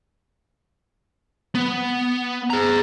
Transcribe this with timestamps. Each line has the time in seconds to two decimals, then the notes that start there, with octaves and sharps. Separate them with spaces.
1.55 B3
2.50 G#4 A#5